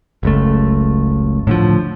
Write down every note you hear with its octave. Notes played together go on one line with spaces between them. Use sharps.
F#1 C#2 A3
A2 D3 F3